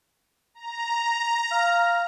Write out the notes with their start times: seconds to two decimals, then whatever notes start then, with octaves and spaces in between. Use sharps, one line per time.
0.55 A#5
1.52 F5